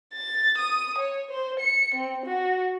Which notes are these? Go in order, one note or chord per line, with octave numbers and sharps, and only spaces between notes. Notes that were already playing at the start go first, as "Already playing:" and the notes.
A6
D#6
C#5
C5
C#7
C4
F#4